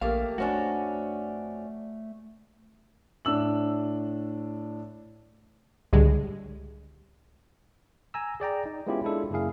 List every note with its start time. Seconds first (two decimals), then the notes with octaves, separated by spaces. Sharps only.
0.01 A#1 A3 A#3 G4 F5
0.38 F2 A3 C#4 D4 F#4
3.25 A2 D4 E6 F#7
5.93 C#2 A2 D3 G3 G#3
8.14 G#5 A#5 E6
8.40 G#4 D5 G5 A#5
8.66 D#4
8.87 G#3 B3 C#4 E4 F4 G4
9.04 G#3 D4 E4 F4 A4
9.31 F#2 C#3 A#3 E4 G#4 F5